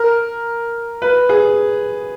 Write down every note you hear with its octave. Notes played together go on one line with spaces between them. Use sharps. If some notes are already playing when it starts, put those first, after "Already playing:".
Already playing: A#4
B4
G#4